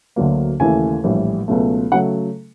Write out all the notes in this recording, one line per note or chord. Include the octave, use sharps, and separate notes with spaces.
D2 D3 F#3 A#3
D#2 C#3 E3 A3 G#5
A#1 A2 E3 G3
C#2 B2 F#3 A3
C#3 F#3 A3 F#5